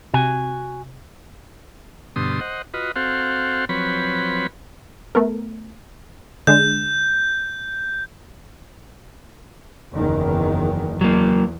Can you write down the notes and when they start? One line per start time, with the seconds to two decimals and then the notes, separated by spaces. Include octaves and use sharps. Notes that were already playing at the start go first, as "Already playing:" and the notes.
0.14 C3 F#4 G#5
2.16 G2 B2 D3 C6 D#6
2.41 C5 D#5 F#5
2.74 F4 F#4 B4 D#5
2.96 C4 F#4 A4 C5 F5 F#5
3.69 F3 F#3 C4 B4 C#5 B5
5.15 A3 B3 A#4
6.47 D3 G#3 D4 G6
9.93 F#1 E2 D#3
11.01 E2 F#3 A#3